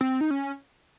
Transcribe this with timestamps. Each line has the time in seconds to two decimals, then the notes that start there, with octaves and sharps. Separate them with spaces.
0.01 C4
0.21 D#4
0.31 C#4